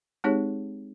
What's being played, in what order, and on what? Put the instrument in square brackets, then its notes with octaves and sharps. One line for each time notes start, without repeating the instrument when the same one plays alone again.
[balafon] G#3 C4 D#4 G4 G#4 C#5